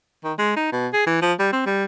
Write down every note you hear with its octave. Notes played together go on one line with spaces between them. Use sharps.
D#3
G#3
D#4
B2
G#4
E3
F3
G3
C4
G3